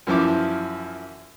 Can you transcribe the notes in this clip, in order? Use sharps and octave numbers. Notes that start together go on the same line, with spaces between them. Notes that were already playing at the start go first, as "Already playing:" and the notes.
F#2 E3 F3 E4 D6